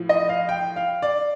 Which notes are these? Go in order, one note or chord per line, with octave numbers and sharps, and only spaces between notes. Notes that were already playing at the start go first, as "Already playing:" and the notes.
Already playing: A2 F3
D#5
F5
G5
F5
D5